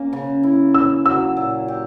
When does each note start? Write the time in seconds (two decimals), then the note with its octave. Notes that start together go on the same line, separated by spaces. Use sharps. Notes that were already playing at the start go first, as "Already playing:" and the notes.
Already playing: A#3 C#4
0.13 C#3
0.43 E4
0.74 A#3 E6
1.06 F#3 E6
1.37 A#2
1.68 G4